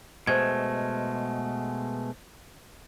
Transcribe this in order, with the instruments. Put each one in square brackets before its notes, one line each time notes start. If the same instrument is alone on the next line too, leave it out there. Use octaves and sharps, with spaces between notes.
[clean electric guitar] B2 G#3 A3 [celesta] C5 G#6